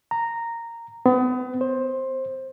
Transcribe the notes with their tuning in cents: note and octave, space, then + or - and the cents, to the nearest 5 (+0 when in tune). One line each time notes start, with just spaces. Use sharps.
A#5 -10
B3 +35
C5 +15